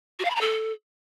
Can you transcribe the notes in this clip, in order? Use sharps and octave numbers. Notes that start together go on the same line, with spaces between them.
F#4
F5
B5
A#5
A4